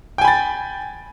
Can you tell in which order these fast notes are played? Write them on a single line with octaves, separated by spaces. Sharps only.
G5 G#5 B5 A6